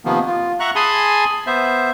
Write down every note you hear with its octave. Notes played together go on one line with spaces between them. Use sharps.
C3 D#3 F3 A#3 B3
F4
E5 F#5 A#5 C#6 F#6
G#4 G#5 A5 B5 C6 D#6
B3 C5 E5